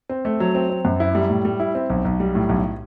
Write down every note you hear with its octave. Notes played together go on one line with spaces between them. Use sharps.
C4
A3
F#3
C4
C4
F#2
E4
G3
A2
G3
E4
C4
B1
B1
G3
A2
B1